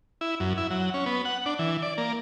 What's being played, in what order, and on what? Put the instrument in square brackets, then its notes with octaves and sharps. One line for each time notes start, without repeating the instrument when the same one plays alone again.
[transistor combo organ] E4
F#2
E4
F#3
C#4
B3
F#5
D4
E3
D5
A#3